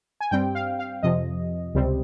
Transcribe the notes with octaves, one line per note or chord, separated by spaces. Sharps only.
G#5
G2 G3 C4 G5
F5
F5
F2 C3 F3 D#5
C#2 C3 G3 C4